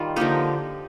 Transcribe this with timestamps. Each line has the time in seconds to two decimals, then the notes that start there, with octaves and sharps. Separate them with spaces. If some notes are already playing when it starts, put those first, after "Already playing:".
Already playing: D#3 G3 F4
0.16 D3 F3 A#3 D#4 G4